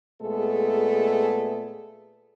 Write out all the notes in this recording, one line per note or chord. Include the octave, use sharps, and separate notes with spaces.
A#2 G#3 A3 B3 G#4 A4